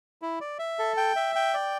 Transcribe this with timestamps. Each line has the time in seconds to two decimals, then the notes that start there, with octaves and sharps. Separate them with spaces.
0.22 E4
0.41 D5
0.59 E5
0.79 A4
0.97 G5
1.16 E5
1.35 G5
1.54 D5